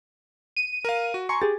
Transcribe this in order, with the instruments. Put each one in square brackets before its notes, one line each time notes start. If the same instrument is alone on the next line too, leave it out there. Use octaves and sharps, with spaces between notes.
[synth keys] D#7
[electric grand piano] A#4 F5
F#4
[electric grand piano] G#5 A#5 C6 [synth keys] C#6
[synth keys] G4 G#4 [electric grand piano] A6